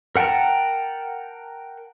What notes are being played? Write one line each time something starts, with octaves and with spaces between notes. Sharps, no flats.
A#4 F#5 G5 A5 A#5